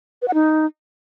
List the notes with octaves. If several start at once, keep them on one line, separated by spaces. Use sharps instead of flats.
B4
F#5
D#4